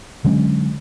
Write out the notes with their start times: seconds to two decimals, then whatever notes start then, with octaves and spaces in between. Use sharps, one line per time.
0.24 D3 F#3 G#3 C#4